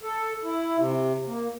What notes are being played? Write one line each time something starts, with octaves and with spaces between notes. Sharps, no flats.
A4
E4
C3
A#3